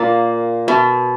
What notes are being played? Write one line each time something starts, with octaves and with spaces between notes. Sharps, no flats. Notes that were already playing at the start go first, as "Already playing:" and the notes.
Already playing: A#2 A#3
B2